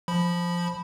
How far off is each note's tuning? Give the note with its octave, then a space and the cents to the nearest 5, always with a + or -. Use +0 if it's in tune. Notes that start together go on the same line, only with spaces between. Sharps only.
F3 +0 B5 +0